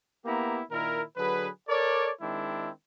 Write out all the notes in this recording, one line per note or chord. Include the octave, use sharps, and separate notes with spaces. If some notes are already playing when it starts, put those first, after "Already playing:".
A#3 B3 E4 G4 A#5
A#2 D#3 E4 A#4
D3 F#3 G#4 B4
A4 A#4 C#5 D5
D#3 G#3 C4 D4 E4